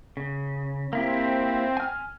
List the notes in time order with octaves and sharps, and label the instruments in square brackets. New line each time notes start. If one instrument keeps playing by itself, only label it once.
[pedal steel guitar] C#3
[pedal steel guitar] A#3 E4 G4 [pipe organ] C4
[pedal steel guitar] G#5 F6